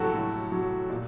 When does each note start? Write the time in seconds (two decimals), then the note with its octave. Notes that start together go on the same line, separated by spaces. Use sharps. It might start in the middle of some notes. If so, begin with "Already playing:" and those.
Already playing: A2 F#3 F#4 G4 A4
0.14 A2
0.52 F#3
0.90 A#2